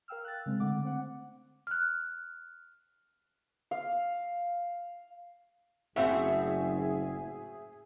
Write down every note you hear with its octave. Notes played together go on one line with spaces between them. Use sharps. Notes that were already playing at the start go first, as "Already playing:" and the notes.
A#4 F5 G5 E6 F6
F#6 A6
C#3 G#3 C4
D3 A3 F#5 D6
C4 F#5
F6 F#6
F5
F#1 A2 C4 F#4 G#4 E5